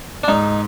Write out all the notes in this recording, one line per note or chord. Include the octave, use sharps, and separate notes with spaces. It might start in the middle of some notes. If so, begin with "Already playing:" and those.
D4
G#2 D#4